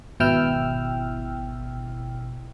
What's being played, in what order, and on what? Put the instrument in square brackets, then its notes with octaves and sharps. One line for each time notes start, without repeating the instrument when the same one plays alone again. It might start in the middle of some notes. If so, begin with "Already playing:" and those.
[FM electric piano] G#1 B2 E4 G5 E6 F6